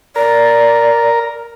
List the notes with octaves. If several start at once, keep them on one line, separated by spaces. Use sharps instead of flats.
A#4 D5